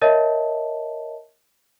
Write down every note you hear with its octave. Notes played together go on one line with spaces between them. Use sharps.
A#4 C#5 D#5 E5 A5